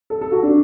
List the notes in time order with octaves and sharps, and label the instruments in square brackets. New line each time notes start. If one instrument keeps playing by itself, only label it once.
[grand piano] A4
A4
F#4
D4